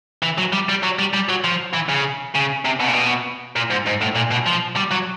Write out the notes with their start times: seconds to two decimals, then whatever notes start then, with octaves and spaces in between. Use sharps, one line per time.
0.23 E3
0.38 F#3
0.53 G3
0.69 G3
0.83 F#3
0.99 G3
1.14 G3
1.29 F#3
1.44 F3
1.74 E3
1.89 C#3
2.35 C#3
2.65 C3
2.80 B2
2.87 A#2
2.93 B2
3.56 A#2
3.70 G#2
3.86 G#2
4.01 A2
4.15 A#2
4.31 B2
4.46 F3
4.76 G3
4.91 F#3